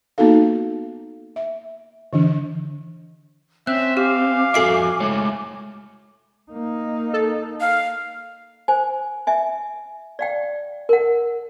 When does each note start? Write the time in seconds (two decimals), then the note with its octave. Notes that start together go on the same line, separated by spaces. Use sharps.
0.18 A#3 B3 D#4 F#4 A4 F5
1.36 E5
2.13 D3 E3 D4
3.67 C4 C#4 E5 F#6
3.97 G4 F5 G#5 D6
4.54 F2 F#4 A4 E5 C7 D7
5.00 G#3 A3 C#5
6.51 A#3 D#4
7.14 A4
7.61 F5
8.68 C5 G#5
9.27 E5 G#5
10.19 D5 F5 G5
10.89 A#4 F#5